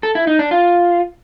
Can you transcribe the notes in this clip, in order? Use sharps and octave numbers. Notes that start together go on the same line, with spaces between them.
A4
E4
D#4
D4
F4